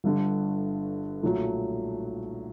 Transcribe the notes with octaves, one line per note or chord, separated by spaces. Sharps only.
G1 G2 D3
B1 A#2 F#3 A3